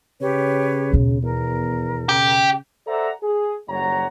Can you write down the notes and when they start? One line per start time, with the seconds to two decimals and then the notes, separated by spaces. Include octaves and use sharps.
0.21 C#3 G4 B4 C#5
0.92 D#2 B2
1.23 E2 A#4
2.09 C#3 G4
2.87 A4 C5 D5 E5 F#5 A#5
3.21 G#4
3.68 F#1 D#2 G3 C#5 F#5 A#5